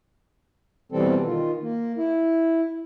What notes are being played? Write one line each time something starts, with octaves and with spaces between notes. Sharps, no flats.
B2 E3 G3 C4 A4
D#3 F4
A#3
E4